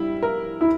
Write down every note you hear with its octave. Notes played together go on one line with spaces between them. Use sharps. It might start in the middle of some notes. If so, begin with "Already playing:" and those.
Already playing: G3 E4
A#4
E4